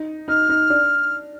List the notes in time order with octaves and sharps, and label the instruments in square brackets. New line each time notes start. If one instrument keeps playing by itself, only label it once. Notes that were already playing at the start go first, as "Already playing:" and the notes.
Already playing: [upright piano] D#4
[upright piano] D#4 [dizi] F6
[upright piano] D#4
D4